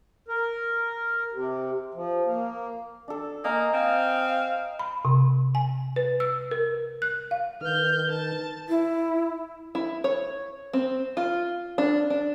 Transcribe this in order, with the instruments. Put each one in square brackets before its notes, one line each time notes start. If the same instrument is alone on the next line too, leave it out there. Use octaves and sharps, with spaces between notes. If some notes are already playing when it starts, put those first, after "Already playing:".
[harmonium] A#4
C3
F3
A#3
[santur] D4 A4
[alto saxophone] A#3 [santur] D#5 G#5 A#5
[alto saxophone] C4 [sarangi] F5
[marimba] B5
C3
G#5
B4
E6
A#4
F#6
F5
[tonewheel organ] D#3 [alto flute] B4 [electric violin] F6 G6
[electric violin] A5
[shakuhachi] E4
[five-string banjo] E4
C#5
C4
F4
D4
D4